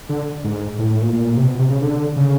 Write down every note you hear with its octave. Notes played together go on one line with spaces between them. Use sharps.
D3
G#2
A2
A2
A#2
A#2
C3
B2
C3
C#3
D3
C#3